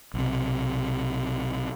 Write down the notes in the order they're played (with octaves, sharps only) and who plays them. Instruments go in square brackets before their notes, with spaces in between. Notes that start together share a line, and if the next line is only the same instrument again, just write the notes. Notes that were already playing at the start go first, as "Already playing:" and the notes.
[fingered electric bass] B1 C3